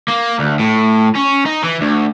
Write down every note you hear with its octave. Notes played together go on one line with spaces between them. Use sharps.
A#3
D2
A2
C#4
D#4
E3
D2